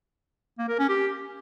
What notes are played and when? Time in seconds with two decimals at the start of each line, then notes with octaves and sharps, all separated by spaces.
0.58 A#3
0.69 A#4
0.79 C#4
0.89 G4